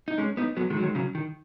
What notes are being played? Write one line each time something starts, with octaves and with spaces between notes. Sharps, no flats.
D#4
G#3 C#4
B3 D#4
F#3 B3
D#3 G#3
F#3
D#3 G#3
C#3 F#3
D#3